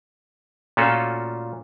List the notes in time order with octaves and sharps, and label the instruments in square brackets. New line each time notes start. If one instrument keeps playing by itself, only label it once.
[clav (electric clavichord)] A#2 A3 C#4 F4 F#4 A4